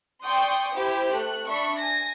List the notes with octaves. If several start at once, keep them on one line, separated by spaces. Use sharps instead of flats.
D5 G5 C6 C#6 D#6
E4 G4 C5
A3 F#6
D4 E5 B5 C#6
G#5 A#6